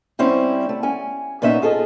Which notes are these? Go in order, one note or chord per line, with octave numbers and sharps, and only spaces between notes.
G3 C4 C#4 E4
A3
C#4 G#5
A#2 B3 C#4 D#4 E5
F4 G#4 A4 C5 D#5